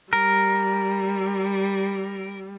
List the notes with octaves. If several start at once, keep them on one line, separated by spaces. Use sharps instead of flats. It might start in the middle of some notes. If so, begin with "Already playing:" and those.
G3 A#4